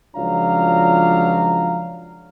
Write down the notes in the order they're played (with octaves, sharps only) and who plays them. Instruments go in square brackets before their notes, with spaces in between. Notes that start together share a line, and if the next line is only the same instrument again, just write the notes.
[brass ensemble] C#2 F3 F#3 D4 F5 A#5